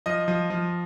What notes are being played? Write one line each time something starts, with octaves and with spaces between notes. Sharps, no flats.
F3 D#5
F3
F3